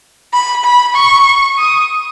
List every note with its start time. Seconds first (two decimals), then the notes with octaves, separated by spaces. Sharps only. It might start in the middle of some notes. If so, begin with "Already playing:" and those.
0.33 B5
0.64 B5
0.95 C#6
1.58 D#6